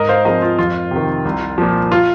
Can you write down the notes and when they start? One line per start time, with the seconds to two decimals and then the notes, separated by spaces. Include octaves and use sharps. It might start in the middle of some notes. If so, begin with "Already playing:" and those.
Already playing: G#2 A#4 D#5
0.09 C5 F5
0.25 F3 G#3 C4 A#4 D#5
0.42 F4
0.58 F2 F4
0.91 C3 D#3
1.25 C2
1.58 A#2 F3
1.92 F4